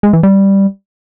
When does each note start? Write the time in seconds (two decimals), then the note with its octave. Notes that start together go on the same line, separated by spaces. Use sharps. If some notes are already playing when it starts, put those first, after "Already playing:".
0.03 G#3
0.13 E3
0.23 G3